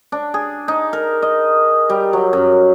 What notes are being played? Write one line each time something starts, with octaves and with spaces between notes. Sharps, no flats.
D4
G#4
D#4
A#4
D#5
G3
F#3
F#2